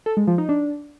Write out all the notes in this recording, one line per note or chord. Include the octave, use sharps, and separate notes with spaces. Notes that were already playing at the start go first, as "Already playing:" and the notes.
A4
G#3
F3
D#4
D4